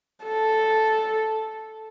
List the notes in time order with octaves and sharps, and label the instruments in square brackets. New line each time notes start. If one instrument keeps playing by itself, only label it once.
[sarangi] A4